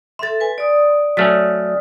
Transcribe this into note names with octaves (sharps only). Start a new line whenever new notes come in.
A4 E5 C6 A6
B4 G#5
D5 D#6
F#3 A3 C#4 F6 A6 B6